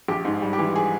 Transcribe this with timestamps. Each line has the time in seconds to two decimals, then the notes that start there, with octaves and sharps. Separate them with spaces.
0.08 A#1 G4
0.25 G#2
0.42 G3
0.53 G4
0.59 E3
0.75 G#4